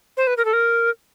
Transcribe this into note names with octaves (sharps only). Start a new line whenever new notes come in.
C5
B4
A#4
A4
A#4